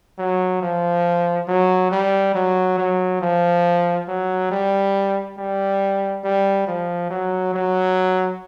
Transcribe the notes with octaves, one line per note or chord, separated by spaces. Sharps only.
F#3
F3
F#3
G3
F#3
F#3
F3
F#3
G3
G3
G3
F3
F#3
F#3